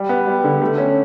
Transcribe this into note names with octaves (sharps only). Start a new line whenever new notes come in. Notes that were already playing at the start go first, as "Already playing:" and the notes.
Already playing: G3
B3
G3
D3
A3
C#4